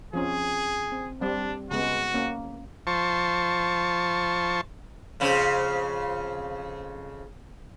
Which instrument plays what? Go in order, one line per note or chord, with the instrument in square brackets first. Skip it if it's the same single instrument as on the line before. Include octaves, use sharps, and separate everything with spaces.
[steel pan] F3 C4 C#4 [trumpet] G#4
[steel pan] C4
[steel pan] G3 C4 [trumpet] D4
[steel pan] C#3 G#3 B3 [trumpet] F#4
[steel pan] A#3 C#4
[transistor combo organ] F3 C5 A5 C#6
[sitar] F2 C#3 C4